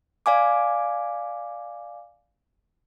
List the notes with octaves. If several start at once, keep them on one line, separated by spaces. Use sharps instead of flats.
D5 F5 G#5 D6